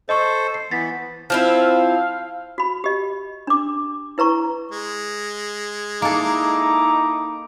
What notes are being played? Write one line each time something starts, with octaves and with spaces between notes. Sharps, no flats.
A4 C5 D#5 C#6
C7
E3 B3 A6 B6
F3 C4 E4 F5
F#4 B5
G4 D#5
D4 D6
E4 B4 A#5 C#6
G#3
A#3 D#4 E4 A4 A#5 D6